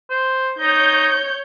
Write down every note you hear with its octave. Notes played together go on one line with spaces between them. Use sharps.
C5
D#4 C#5 G6